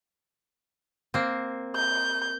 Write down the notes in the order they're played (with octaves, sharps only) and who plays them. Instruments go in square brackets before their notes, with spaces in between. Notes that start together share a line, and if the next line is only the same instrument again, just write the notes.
[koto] A#3 C4
[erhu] G6